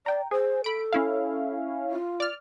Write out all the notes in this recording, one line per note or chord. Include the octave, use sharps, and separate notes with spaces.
D5 G5 A#5
G#4 C5
A4 B5 D7
C#4 E4 F5
F4
D5 F6